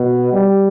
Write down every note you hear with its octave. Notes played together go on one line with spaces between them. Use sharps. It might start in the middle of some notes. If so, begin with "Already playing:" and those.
Already playing: B2
G3